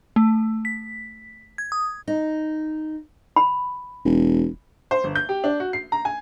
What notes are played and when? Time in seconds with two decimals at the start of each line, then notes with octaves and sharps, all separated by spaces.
0.16 A3
0.65 B6
1.58 G#6
1.72 D#6
2.07 D#4
3.36 B5
4.05 E1
4.91 C5
5.04 G1
5.16 G6
5.29 G4
5.44 D4
5.60 F#4
5.73 C7
5.92 A#5
6.05 G#5